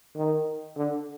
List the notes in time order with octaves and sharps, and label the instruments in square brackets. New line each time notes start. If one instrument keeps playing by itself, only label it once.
[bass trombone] D#3
D3